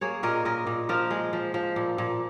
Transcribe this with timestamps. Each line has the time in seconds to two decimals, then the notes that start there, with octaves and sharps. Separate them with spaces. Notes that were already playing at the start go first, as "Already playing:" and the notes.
0.01 A#3 G#4 C#5
0.23 A#2 A#4 D#5
0.45 A#2 A#4 D#5
0.67 A#2
0.89 F3 F4 A#4
1.10 G#3
1.33 F3
1.54 F3
1.76 A#2
1.98 A#2